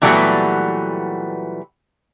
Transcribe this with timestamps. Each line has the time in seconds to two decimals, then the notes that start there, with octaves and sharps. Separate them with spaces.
0.02 A#2 E3 F#3 G3 A3 B3